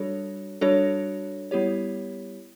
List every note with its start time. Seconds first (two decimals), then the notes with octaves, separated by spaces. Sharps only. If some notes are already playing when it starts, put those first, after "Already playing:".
Already playing: G3 D4 F#4 A4 C#5
0.61 G3 D4 F#4 A4 C#5
1.51 G3 B3 E4 G4 C#5